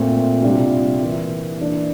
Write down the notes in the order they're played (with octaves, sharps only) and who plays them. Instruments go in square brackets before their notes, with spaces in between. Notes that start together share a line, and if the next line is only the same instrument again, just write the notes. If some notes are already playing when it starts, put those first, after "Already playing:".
Already playing: [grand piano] A#2 A3 C4 F4
C3 G3 D4 F4
E3 A#3 E4
E3 A#3 D4